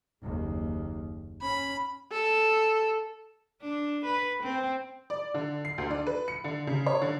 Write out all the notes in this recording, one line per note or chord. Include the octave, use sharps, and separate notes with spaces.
F#1 D#2
C#4 B5
A4
D4
B4
C4
D5
D3
C7
D2
D4
B4
C#7
D3
C#3
C#5
D3